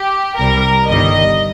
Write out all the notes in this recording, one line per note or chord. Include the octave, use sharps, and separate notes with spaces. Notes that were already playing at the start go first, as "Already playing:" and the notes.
Already playing: G4
C2 C3 G3 A#4
G1 G2 D#3 G3 D#5